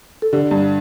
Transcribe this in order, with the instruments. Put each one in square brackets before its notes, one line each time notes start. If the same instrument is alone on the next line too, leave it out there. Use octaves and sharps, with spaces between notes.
[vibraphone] A4
[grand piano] D3 [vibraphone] G4
[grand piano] G2